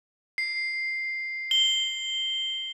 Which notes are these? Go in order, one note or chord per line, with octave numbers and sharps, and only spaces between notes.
C7
G7